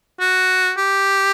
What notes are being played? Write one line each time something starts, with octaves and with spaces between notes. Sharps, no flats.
F#4
G4